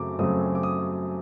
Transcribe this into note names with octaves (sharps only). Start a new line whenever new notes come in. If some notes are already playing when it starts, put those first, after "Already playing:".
Already playing: F#2 C#3 F#3 A3 C4 D6
F#2 C#3 F#3 A3 C4 D#6
D6
D#6